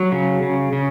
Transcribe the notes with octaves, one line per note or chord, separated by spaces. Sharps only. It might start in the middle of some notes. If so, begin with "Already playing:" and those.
Already playing: F#3
C#3
C#3
C#3